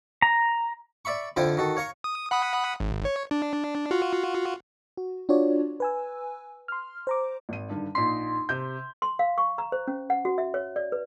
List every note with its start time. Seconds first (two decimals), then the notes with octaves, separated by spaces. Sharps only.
0.22 A#5
1.05 D5 E5 B5 C#6
1.36 F2 D3 E4 F4 C5 G5
1.57 D#3 F#4 A4
1.77 C#5 F5 A#5 C#6
2.04 D#6
2.31 F#5 B5 D#6
2.80 G#1
3.05 C#5
3.31 D4
3.91 F4 F#4
4.97 F#4
5.29 D4 F4 F#4 C#5 D5
5.80 B4 G#5 E6
6.68 C6 F6
7.07 C5 A#5 D6
7.49 G#1 D#7
7.70 G2 D3 D#3
7.95 A#1 D#4 C6 B6
8.49 C3 G6
9.02 C6
9.19 F5
9.38 C#6
9.58 A#5
9.72 C5
9.88 C#4
10.10 F#5
10.25 F#4
10.38 E5
10.54 C#5
10.76 D5
10.92 B4